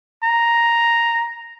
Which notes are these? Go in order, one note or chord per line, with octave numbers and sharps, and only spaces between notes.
A#5